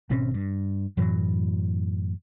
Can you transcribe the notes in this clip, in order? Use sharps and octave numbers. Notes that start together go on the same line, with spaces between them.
G#1 B2 C4 C#4
G2
F#2 A2 E3 F#3